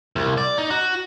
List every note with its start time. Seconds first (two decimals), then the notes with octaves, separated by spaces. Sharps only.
0.16 C2
0.38 D5
0.58 D#4
0.70 F#4